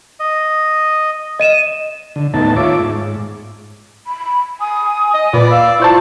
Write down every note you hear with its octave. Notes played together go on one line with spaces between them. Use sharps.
D#5
D#5 D#7 E7
D3
D#2 A2 B3 D#4 A5
F4 C#5 E5 D6
G#2
B5
G#5 D#6
D#5
A#2 B4 D5 B5
F5 E6
E4 F4 C5 A5 C#6